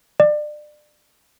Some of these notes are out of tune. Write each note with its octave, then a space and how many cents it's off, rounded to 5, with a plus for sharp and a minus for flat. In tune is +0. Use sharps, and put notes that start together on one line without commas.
D5 +30